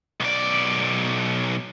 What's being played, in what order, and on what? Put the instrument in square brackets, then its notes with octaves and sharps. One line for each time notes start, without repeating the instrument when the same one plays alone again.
[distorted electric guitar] B1 D5